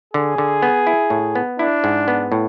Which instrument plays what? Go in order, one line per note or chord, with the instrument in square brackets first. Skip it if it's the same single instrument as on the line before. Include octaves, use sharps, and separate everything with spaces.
[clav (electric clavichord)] D3 [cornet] G#4
[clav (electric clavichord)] D3
B3
E4
A2
B3
[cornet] D4 [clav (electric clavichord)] E4
[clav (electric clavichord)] G#2
B3
A2